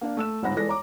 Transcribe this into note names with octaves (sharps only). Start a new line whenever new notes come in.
A#3 D4 F5
A3 E6 E7
G1 C#2 G#2 F#5 B5 A#6
E3 G#3 A4 D5 A#6
C#5 A#5 D6